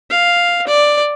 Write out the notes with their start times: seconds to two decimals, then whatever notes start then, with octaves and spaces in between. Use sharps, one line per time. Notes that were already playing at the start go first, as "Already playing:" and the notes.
0.10 F5
0.68 D5